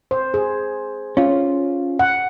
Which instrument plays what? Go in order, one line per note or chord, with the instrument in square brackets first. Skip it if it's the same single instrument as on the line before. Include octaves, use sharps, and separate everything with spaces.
[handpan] C5
G#4
[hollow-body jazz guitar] C#4 F4
[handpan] F#5